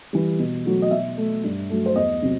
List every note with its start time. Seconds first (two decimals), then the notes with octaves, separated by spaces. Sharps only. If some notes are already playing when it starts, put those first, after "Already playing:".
0.13 E3 G3
0.39 B2
0.65 F#3 A3
0.82 D#5
0.91 B2 E5
1.17 A3
1.44 G2
1.70 F#3 A3
1.86 C5
1.96 E2 D#5
2.22 C3 F#3